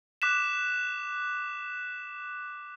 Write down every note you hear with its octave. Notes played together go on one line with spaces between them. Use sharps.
D6 F#6 B6 E7